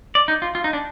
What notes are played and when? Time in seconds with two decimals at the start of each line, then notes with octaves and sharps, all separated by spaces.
0.15 D5
0.28 D#4
0.42 F4
0.55 F4
0.64 D#4
0.73 D4